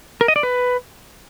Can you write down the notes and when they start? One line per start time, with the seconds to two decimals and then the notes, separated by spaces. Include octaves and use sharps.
0.21 A#4
0.28 D#5
0.36 D5
0.43 B4